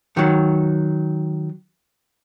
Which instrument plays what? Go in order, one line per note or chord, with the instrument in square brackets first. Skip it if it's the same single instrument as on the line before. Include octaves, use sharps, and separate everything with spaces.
[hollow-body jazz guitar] D#3 F#3